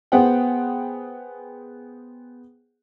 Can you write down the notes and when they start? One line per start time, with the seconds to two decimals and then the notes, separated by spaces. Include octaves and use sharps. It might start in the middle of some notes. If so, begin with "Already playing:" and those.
0.12 B3 G#4 C5 F#5 G5